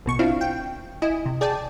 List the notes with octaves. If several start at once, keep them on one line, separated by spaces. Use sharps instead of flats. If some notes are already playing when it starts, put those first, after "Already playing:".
A#1 B2 C#6
C4 D4 E4 F4 F5
G5
E4 D#5 G#5
C3
G#4 D5 G5 A5